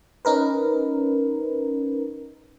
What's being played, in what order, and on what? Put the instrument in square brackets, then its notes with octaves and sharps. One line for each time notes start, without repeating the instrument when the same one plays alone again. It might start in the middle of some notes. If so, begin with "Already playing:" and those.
[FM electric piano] C#4 D#4 A#4 B4